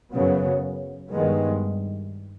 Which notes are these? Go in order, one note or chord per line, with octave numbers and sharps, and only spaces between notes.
F#2 C#3 F#3 B3
G2 D#3 G#3 B3